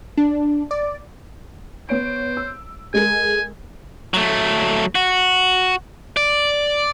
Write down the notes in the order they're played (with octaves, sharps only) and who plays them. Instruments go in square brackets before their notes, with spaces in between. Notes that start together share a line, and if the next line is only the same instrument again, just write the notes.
[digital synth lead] D4
D5
[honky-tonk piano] B3 C#5 D7 [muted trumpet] C5
[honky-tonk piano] E6
[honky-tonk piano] G#3 A4 A#4 [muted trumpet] G#5
[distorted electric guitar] F#3 A3
F#4
D5